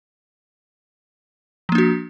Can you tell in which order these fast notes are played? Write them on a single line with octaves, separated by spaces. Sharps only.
F3 A#3 D4 F#4